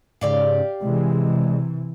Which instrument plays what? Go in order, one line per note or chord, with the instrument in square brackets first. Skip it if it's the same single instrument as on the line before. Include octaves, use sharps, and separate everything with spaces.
[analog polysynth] G#2 C#3 [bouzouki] G4 D5 F5
[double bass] C3 E3 [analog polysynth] G#3